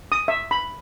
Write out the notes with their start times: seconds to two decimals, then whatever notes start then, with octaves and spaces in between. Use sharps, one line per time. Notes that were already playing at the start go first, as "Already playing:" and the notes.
0.12 D#6
0.28 E5
0.51 B5